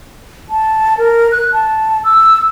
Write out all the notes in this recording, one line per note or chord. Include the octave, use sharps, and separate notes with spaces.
A5
A#4
F#6
A5
E6